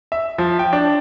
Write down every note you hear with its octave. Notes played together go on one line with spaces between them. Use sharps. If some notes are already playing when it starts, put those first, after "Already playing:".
E5
F3
G5
D4